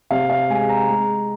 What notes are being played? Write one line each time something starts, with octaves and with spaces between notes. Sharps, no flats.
C3 F5
F5
G#3 G#5
A#5
G#3 A#5